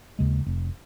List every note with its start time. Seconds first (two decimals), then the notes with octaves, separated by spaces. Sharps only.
0.19 D#2 C#3 G#3
0.46 F1